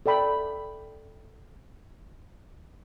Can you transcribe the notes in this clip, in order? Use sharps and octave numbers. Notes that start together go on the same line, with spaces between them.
A4 D5 G5 B5